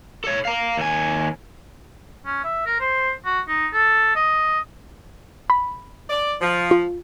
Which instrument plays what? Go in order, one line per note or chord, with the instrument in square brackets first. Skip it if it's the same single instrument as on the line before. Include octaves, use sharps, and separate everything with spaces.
[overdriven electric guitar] A4 C#5
F5 A#5
D#2 G#5
[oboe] C#4
E5
A#4
C5
F#4
D#4
A4
D#5
[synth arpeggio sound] B5
[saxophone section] D5
F3
[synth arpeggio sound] F4